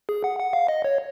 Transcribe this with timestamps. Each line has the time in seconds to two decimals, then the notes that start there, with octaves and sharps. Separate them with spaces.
0.09 G#4
0.24 F#5
0.39 F#5
0.53 F5
0.68 D#5
0.84 C#5